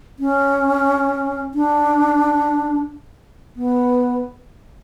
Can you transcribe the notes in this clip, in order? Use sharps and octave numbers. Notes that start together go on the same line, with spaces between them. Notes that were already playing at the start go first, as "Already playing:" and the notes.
C#4
D4
B3